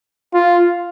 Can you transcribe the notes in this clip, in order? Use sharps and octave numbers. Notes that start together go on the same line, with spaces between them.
F4